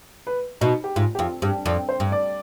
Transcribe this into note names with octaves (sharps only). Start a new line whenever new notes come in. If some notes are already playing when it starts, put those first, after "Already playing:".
B4
B2 D#4
G4
G#2 F4
G4
F2 F4
G2 G4
F2 D5
C5
G2
D5